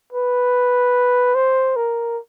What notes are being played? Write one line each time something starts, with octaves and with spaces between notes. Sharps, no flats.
B4
C5
A#4